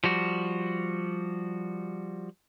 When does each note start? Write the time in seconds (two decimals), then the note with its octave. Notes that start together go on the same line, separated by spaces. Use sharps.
0.04 F3 G3 F#4